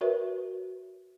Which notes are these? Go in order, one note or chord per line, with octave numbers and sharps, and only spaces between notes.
F#4 A#4 B4 C#5 E5